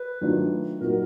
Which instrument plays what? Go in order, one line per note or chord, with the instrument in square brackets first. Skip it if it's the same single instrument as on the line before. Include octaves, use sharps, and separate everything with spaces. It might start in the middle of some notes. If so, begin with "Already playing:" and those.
Already playing: [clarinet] B4
[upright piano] D#3 F#3 A3 D4 F4
[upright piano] A#2 F#3 A#3 D#4 F#4 [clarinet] A#4